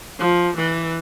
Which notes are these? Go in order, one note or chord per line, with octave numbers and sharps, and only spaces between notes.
F3
E3